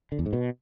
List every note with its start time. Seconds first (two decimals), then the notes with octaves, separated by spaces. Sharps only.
0.12 D3
0.19 E2
0.26 G#2
0.33 B2